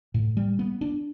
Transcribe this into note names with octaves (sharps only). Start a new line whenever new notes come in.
A2
G3
B3
D4